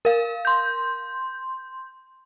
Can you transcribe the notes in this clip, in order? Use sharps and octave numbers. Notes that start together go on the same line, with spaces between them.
A#4 F5
C6 G6